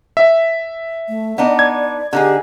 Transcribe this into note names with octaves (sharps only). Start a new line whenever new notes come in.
E5
A3
B3 D4 D#4 D5
G#6
D3 D#4 G4 G#4